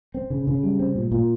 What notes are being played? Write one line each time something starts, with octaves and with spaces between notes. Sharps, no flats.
C4
C#3
C#3
G3
C4
A#2
A#2